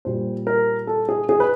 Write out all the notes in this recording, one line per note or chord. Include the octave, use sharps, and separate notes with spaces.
A#2 G3 C5
A#4
A4
G#4
G#4
B4